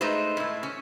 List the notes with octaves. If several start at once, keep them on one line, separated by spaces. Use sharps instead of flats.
G#3 A3 D#4 B4 C5
A2 E4
C#4